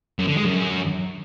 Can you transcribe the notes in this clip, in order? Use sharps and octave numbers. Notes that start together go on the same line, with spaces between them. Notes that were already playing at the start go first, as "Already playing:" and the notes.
F#2
D3
G#3
F#2